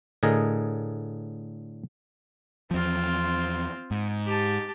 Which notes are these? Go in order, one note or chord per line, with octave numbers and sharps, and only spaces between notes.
A2 D3 G#4 A#4 D#5
E2 F3 C4 F4
G#2
G4 A5